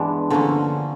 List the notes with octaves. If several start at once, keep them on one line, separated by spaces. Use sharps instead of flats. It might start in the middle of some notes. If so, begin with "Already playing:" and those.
Already playing: G2 E3 G#3 B3 D4
D3 F3 A#3 C#4